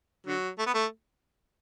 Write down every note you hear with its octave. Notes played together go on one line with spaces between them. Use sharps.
D3 F#3
A3
B3
A3